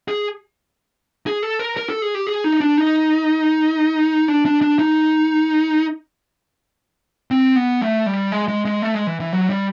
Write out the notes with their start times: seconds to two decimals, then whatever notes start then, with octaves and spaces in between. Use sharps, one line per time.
0.08 G#4
1.26 G#4
1.43 A4
1.59 A#4
1.77 A#4
1.89 A4
2.02 G#4
2.15 G4
2.27 G#4
2.44 D#4
2.60 D4
2.78 D#4
4.28 D4
4.46 D4
4.61 D4
4.79 D#4
7.31 C4
7.56 B3
7.82 A3
8.06 G3
8.32 G#3
8.48 G#3
8.65 G#3
8.82 A3
8.95 G#3
9.07 E3
9.20 E3
9.32 F#3
9.50 G3